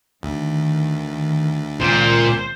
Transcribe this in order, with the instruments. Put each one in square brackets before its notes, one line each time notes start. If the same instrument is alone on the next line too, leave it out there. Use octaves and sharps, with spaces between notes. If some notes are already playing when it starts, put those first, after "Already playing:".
[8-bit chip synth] D2 [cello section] D#3
[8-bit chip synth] C#2 [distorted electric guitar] A#2 [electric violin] C5